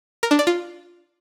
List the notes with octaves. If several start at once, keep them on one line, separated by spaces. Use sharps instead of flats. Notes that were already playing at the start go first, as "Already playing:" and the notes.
A#4
D4
D5
F4